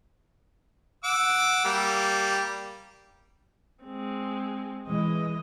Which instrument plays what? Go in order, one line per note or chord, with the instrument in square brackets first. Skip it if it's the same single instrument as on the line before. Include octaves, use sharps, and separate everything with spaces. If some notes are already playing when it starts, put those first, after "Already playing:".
[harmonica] F#5 D6 E6
G3 A#3
[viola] G#3 C4
[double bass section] E3 G#3 [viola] D#5